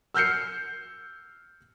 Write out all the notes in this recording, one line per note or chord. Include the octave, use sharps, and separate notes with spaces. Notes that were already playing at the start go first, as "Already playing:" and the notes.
E6 F6 G6 C7 C#7